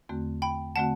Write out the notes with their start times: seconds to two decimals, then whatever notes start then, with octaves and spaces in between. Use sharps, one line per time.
0.09 E2 D3 A3 C4 F#4
0.42 G5 B5
0.76 D3 A3 C4 F#4 F#5 A5